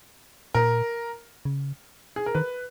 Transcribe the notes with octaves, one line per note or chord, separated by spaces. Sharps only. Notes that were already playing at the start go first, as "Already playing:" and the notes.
A#2 A#4
C#3
G#4
A#4
D#3 B4